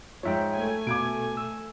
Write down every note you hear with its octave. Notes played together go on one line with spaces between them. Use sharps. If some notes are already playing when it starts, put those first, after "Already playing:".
G#2 F3 C#5 E5 G5
A3 G#5
B2 D6 G#6 D7
E6